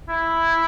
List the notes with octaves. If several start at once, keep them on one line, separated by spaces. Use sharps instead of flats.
E4